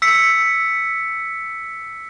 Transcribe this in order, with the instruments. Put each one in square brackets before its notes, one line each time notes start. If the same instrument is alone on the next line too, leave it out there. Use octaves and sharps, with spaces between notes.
[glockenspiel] E6 B6 C#7